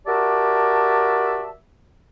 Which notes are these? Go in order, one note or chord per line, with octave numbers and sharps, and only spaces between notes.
F#4 G4 A#4 D5 E5 A5